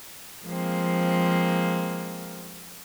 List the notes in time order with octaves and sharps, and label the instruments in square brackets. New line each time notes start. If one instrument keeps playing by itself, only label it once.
[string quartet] F3 G#3 A#3 C4